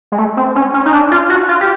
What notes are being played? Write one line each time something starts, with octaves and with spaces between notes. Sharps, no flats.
G#3
A3
C4
C#4
C#4
D#4
D4
F4
F#4
F4
G4